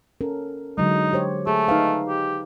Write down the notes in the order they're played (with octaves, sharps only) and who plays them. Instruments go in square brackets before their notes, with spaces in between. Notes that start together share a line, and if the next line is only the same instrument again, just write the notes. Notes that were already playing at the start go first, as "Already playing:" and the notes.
[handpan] C#4 A4 A#4
[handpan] D3 F#3 G#3 [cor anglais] D#4
[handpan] G4 C5 C#5
[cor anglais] A3 [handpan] G#4
[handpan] D#4 B4 F5
[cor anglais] G4